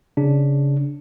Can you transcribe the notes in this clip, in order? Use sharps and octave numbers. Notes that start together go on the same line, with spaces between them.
C#3 D4